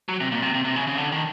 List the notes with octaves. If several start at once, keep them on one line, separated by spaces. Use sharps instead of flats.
F#3
C3
A#2
C3
C3
C3
C#3
C#3
D3
D#3